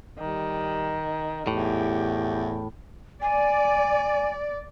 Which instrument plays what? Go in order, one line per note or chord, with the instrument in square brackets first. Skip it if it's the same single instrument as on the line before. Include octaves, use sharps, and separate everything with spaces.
[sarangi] D#3 [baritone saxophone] G3
[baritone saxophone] E2 [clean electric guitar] A2 [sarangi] G4
[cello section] D5 [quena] G#5